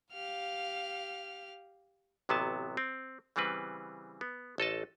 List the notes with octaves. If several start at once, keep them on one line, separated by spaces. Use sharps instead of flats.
G4 F5 F6
A1 C3 F#3 B3 G#5 A5
C4
C#3 E3 G3 C4 B4
B3
A1 A4 D#5 A5